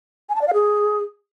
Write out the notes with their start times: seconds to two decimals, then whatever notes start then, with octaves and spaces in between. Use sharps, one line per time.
0.29 G#5
0.35 A5
0.41 D5
0.47 F5
0.54 G#4